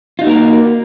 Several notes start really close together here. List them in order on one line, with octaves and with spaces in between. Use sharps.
F4 D#4 F#4 A#3 A#4